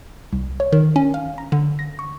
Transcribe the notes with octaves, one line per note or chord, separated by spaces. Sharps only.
C2
C#5
D#3
C#4
F5
A#5
D3
A#6
C#6